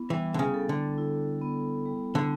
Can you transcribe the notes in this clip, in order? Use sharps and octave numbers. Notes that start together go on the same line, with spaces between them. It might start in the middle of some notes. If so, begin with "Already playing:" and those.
Already playing: B3 E4
E3 G3
D3
C#3
A4
D3
E4
B3
G3
D3